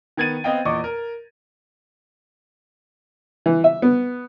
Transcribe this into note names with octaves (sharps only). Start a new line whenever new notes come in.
D#3 B3 G#6 A6 D#7
B3 C4 D#5 F5 G5
E2 A#2 D#5 C#6 D6
A#4
E3
E5
B3